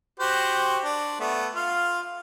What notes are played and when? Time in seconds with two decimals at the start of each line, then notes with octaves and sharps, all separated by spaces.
0.20 F#4 G4 C5
0.84 D4
1.20 A3 B3
1.55 F4 F5